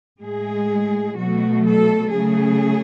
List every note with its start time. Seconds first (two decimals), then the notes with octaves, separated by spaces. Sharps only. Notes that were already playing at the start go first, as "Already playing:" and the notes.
0.21 A2 G#3 G#4
1.17 B2 F#3 A3 F#4
1.65 A4
2.12 C#3 F#3 A3 G#4